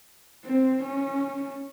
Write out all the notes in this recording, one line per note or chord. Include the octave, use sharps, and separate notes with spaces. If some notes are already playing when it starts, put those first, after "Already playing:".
C4
C#4